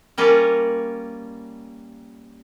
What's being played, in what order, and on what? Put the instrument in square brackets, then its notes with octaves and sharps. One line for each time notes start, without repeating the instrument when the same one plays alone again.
[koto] G3 A#3 C#4 F4